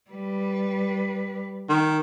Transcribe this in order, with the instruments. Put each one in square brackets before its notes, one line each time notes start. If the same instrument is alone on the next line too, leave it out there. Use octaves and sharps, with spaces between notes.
[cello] G3 B4
[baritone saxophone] D#3